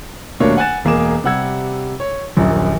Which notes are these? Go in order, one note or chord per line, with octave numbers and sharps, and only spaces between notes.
D#1 B2 A3 A#3 D4 C#5
F#5 G#5 F#6 A6 E7
E1 A#3 G#4 D6 E7
C3 G3 F#5 E6 G#6
C#5
D#1 A#1 F#2